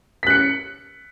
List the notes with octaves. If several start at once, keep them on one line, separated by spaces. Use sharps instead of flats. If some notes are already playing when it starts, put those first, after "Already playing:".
F#6 B6 C#7